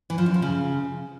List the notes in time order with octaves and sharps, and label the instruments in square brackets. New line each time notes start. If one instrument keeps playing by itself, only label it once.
[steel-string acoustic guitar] E3
F3
F#2
F3
C#3